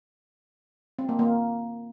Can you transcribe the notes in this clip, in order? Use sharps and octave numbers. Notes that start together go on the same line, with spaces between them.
C4
A#3
A#3